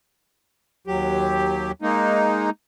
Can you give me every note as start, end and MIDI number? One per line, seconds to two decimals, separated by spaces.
0.87 1.72 39
0.87 1.72 54
0.87 1.72 67
1.82 2.50 56
1.82 2.50 58
1.82 2.50 63